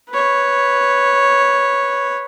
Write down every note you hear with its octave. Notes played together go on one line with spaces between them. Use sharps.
B4 C#5